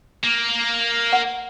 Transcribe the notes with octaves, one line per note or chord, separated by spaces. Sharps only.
A#3
F#5